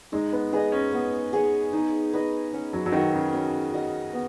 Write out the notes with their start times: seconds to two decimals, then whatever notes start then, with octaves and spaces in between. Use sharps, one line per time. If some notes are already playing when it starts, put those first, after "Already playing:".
0.12 G#3 D#4
0.33 B3
0.53 B3 G#4 D#5
0.72 C#4
0.93 B3
1.33 G#4 C#5
1.73 D#4
2.13 B4 D#5
2.53 C#4
2.73 F#3
2.86 F#3
2.92 D#3 F#4 C#5
3.14 C#3
3.33 C#4
3.73 F#4 D#5
4.13 B3